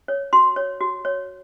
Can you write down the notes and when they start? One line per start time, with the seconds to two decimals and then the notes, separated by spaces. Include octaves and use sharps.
0.08 C#5
0.33 F#4 C6
0.56 C#5
0.81 F#4
1.05 C#5